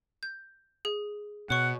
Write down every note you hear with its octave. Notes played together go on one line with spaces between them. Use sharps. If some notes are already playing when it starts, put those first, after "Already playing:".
G6
G#4
B2 C#5 F#5 C#6